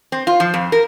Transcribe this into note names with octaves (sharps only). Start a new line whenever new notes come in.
C4
F4
F3
F2
A#4